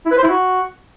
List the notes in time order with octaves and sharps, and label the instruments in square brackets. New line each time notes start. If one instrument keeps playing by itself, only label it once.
[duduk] E4
B4
C5
E4
F#4